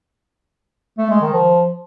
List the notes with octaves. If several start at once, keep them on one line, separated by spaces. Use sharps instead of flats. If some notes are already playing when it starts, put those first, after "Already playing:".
A3
G#3
D#3
F3